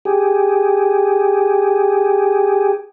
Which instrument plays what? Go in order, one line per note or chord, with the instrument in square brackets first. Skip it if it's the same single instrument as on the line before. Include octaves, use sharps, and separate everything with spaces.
[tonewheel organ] G4 G#4